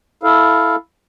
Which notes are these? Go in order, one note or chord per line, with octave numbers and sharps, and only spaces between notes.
E4 A4 F5